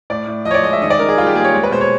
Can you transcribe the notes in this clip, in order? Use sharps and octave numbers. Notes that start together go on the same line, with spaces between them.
A2 D5
A2
F3 D#5
C#5
D5
G#3 D#5
E5
D#3 D#5
D5
D#3 A#4
G#4
G3 F4
G4
A#3 G#4
C#5
G#3
B4
B2 C5
C#5